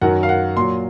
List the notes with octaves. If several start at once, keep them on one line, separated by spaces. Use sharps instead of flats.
F#2 D#3 F#3 F#5
F5
F#5
A#2 F#3 C6